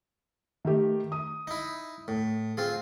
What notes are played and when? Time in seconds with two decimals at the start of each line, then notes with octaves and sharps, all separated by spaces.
0.65 D#3 A3 G4
1.12 D#6
1.47 D#4 E4
2.08 A2
2.57 C4 F4 G#4